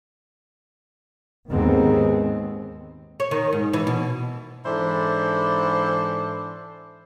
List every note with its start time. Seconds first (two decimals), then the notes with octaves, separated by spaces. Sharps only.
1.50 D#2 G#2 D#3 G#3 B3 C4
3.20 C#5
3.31 D#3
3.53 G#2
3.73 E3
3.87 B2
4.65 G#2 E3 D4 E4 A4 C5